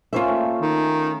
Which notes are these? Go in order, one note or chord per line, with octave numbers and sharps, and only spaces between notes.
A#3 C#4 F4 C5 E5 G#5
A3
D#3